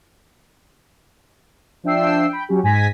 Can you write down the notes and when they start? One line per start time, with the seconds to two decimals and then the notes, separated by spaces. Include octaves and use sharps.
1.84 F3 D4 E5 G5 E6 C7
2.29 G5 B5
2.49 F#3 C#4 G4
2.63 G#2 G#5 G#6 A#6 B6